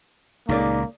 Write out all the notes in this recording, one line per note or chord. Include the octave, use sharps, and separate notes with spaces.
C#2 A#2 A#3 D#4 G#4 D5